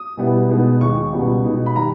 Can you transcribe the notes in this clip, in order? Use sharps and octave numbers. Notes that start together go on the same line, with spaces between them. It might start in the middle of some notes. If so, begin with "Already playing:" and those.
Already playing: D#6
B2 G3 B3 E4
B2 G#3 B3 D#4
D#2 D#3 G#3 D#4 C#6
C#2 B2 G3 B3
B2 G#3 D#4
B5
D#3 G3 A#5